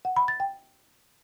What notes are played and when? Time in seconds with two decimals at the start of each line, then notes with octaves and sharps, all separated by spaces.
0.05 F#5
0.17 B5
0.28 A6
0.40 G5